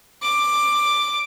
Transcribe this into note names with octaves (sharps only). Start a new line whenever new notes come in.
D6